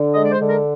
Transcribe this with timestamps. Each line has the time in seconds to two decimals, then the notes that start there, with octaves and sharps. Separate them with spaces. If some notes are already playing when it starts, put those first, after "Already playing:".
Already playing: D3
0.15 G#3 D#5
0.24 D5
0.31 C5
0.41 D3
0.49 A#4